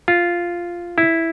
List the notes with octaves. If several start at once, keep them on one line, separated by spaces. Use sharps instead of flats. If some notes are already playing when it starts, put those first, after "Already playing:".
F4
E4